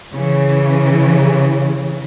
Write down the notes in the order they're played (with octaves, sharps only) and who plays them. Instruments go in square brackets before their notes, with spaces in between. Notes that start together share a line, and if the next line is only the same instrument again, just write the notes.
[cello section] C#3 E3